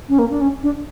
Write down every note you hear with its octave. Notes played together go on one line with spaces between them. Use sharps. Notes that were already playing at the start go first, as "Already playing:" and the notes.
C#4
A#3
D4
C#4
D4